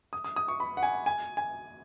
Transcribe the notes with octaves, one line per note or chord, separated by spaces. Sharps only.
D#6
D#6
D#6
C#6
B5
F#5
G#5
G#5
G#5